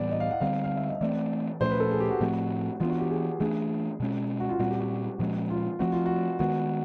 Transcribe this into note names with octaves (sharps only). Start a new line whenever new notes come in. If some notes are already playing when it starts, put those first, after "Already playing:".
Already playing: A2 E3 G3 B3 D5
D#5
F5
F#5
D3 G3 C4 F5
F5
E5
D#5
E3 A3 C4 D5
A#2 F3 A3 C#4 C5
B4
A4
G#4
G4
F#4
A2 F3 A3 C4
E3 G#3 B3 D4 F4
F#4
G4
G#4
E3 A3 D4 G#4
B2 G#3 C#4
F#4
F4
A#2 G3 C4 F#4
G4
F#4
A#2 F3 G#3 C#4
F4
F3 A3 C4 F#4
F4
F#4
D#3 G#3 B3 F#4